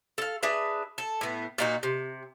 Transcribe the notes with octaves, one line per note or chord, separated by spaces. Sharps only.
A4 F5
D4 G#4 B4 E5
A4
A2 B3
A#2 D#4 F#4
C3